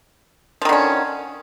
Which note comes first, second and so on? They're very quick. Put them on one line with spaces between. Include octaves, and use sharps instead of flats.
F3 D#3 D3 C#4